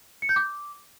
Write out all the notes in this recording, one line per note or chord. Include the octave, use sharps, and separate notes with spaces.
C#7
G6
D6